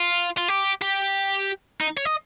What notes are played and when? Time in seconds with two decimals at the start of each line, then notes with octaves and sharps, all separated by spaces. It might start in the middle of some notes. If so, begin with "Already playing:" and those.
Already playing: F4
0.37 F4
0.48 G4
0.81 G4
1.81 D#4
1.97 C#5
2.05 D#5